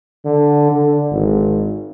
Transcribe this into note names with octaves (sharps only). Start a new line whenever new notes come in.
D3
D3
G#1